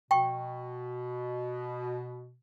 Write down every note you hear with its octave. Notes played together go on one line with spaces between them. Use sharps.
B2 G5 C#6